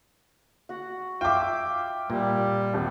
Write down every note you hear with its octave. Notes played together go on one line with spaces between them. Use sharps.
F#4 F#5
F4 E5 G5 D6
A#2 G3
D#1 G#1